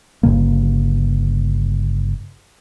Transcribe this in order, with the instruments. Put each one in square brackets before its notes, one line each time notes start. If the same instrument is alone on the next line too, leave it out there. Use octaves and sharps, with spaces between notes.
[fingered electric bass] G1 G2 C#3 A#3